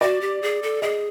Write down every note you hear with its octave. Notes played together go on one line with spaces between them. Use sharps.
F#4 D5
G4
G#4
A4
G#4 D#5